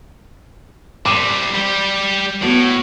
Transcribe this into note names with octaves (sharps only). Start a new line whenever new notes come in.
G3 C4 D6 D#7 E7
G3 G4
A2 B3 F#4